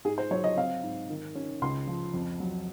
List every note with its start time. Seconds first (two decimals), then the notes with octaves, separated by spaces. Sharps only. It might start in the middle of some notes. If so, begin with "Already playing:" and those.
0.05 G#2 G#4
0.18 C5
0.31 F#3 C#5
0.44 D#5
0.57 C4 F5
0.83 G#2
1.10 D#3
1.35 C#4
1.62 C#2 C6
1.87 F3
2.13 F2
2.40 F#3